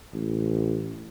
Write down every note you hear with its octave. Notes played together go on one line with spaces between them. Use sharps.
A1